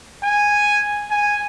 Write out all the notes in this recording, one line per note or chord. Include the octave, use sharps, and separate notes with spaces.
G#5
G#5